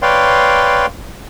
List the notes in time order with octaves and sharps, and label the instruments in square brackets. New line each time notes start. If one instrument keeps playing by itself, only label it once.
[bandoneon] B4 C#5 D5 F5 G5 C6